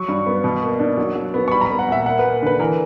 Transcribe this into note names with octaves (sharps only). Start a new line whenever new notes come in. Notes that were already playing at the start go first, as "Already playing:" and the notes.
Already playing: F#3 C#6
G2
B3
B2
A#3
D4
F#3
F#3
B3
C#6
G3 B5
A#5
B5
B3
F#5
A#2 E5
A#3 F#5
A#3 B4
D3 B4
E3 A#4